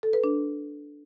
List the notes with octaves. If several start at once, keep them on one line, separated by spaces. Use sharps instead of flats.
A4
B4
D4